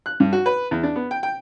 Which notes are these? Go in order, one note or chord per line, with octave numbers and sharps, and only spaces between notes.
F#6
G2
F#4
B4
E2
D4
B3
G5
G5